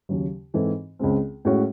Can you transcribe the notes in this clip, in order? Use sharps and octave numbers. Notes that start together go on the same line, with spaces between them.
D#2 C#3 F#3
G#2 E3 C4 E4 A4
C#2 C#3 G#3 C4
A2 G#3 C#4 F#4